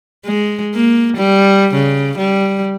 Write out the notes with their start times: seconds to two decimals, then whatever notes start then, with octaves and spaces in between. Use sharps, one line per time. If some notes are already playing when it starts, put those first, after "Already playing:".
0.25 G#3
0.75 A#3
1.17 G3
1.74 C#3
2.18 G3